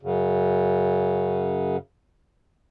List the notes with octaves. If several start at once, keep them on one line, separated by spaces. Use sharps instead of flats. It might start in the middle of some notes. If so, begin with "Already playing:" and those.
F#2 C#3